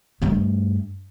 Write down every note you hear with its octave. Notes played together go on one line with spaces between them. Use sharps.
G2 A3